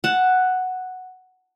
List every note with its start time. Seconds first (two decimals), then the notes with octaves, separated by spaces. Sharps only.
0.04 F#5 A5